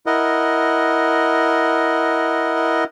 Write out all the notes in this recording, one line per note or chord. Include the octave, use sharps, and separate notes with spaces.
E4 A#4 D#5 F#5